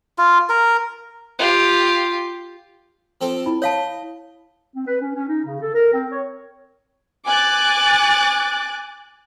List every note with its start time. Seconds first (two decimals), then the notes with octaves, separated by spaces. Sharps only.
0.18 F4
0.49 A#4
1.39 F4 G4
3.21 F3 C4 A4
3.46 E4 B5
3.62 C#5 D#5 F5 A5
4.76 C4
4.87 B4
5.01 C#4
5.16 C#4
5.28 D#4
5.45 C#3
5.61 A4
5.75 A#4
5.94 C4
6.12 C#5
7.27 G#5 D6 F#6 A6